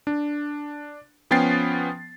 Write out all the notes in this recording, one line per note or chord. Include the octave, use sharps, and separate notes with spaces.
D4
F3 B3 C#4 G5 A6 C7